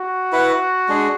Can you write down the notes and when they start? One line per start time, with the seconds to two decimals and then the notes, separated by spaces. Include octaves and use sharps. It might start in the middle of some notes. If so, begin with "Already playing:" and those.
Already playing: F#4
0.32 E4 B4 F#5
0.88 G#3 D4 G#4